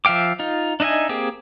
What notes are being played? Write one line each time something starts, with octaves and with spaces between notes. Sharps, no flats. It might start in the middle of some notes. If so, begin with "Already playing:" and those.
F3 E5 F5 G5 D6
D#4 F4
D4 D#4 D#5 E5 G#5
A#3 C4 G4 G#4